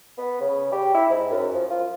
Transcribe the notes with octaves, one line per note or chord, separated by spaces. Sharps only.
B3
C#3
G4
E4
G#2
F#2
F3
F4